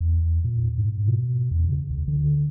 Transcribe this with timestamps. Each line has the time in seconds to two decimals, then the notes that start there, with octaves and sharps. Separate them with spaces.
0.01 E2
0.44 A#2
0.78 G#2
1.07 B2
1.51 E2
1.69 C#3
1.90 D2
2.08 D3